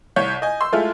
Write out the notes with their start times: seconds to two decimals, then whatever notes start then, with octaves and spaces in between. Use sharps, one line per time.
0.16 C2 C#5 G6
0.42 D#5 G#5
0.61 C6 E6
0.73 G#3 A3 E4 F4